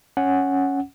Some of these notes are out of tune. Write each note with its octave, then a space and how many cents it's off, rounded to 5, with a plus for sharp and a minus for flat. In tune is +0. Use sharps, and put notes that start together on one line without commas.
C#4 +0 F#5 +0